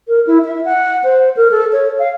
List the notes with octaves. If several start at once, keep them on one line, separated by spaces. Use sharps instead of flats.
A#4
E4
E5
F#5
C5
A#4
A4
C#5
F5